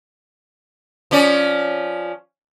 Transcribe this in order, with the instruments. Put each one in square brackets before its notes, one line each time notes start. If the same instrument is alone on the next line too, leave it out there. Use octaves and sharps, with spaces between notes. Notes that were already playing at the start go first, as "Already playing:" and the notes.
[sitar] F3 C#4 D5